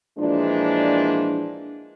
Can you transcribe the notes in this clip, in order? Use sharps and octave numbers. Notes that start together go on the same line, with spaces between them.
A#2 E3 F3 G#3 D4